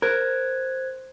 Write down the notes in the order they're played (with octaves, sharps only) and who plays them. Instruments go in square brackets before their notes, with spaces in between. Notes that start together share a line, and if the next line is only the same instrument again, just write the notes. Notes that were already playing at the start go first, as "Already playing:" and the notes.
[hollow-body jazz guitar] A#4 [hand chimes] C5 F#6 G#6